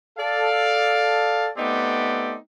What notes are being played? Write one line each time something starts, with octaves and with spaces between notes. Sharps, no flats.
A4 D5 F5
A3 B3 C4 D#4 G4 D5